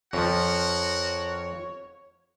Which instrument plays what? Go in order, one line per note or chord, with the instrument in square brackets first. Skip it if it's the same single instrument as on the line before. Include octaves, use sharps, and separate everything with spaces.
[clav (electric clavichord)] F2 F3 [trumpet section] F#4 A#4 F#5 [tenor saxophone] C#5